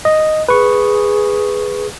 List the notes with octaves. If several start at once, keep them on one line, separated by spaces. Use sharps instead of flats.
D#5
G#4 B4 C#6